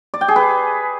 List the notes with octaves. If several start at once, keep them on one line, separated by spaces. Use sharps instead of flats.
D5
G5
G#4
B4